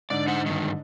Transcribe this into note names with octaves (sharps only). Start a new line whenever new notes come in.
G#2 D3 D5
D#4 C5 F#5
G2 D#3